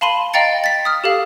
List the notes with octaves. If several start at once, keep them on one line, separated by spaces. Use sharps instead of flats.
F5 A5 B5 C6 D#7 F#7
D#5 F5 G5 A#5 A6 C#7
A6 B6
D#6 F6
G4 A4 F5